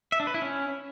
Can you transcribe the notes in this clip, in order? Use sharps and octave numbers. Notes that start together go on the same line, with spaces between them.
E5
D4
B4
E4
C#4